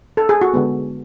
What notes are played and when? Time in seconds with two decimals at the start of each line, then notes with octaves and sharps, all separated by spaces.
0.17 A4
0.29 G#4
0.41 F#4
0.54 D3 G#3 B3